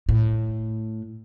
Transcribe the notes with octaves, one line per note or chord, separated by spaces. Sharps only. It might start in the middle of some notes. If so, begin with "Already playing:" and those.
A2